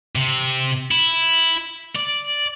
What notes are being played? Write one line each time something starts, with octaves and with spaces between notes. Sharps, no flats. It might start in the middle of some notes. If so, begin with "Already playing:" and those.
C3
E4
D5